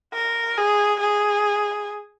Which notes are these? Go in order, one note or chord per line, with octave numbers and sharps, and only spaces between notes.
A#4
G#4
G#4